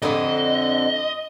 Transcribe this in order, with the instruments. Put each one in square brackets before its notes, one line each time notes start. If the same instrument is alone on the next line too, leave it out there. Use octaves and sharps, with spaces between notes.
[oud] F2 D3 [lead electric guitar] D#5